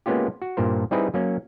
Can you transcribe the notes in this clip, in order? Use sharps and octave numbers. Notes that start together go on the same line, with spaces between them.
G#3 A#3 B3 C#4 F4 G4
F#4
G2 A#2 A#4 C5
G3 C4 D#4 E4 G#4 B4
F#3 A#3 C#4